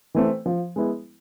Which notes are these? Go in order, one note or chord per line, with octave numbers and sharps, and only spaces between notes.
E3 A3 C4
F3
G#3 B3 E4